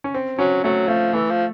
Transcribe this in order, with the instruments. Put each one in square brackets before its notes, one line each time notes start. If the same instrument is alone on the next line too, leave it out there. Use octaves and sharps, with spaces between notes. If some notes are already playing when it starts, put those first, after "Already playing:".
[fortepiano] C#4
C4
[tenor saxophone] F#3 [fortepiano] C#4
[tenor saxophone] F#3 [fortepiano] A3
[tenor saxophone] F3 [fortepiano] A3
[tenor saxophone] E3 [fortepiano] A3
[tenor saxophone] F3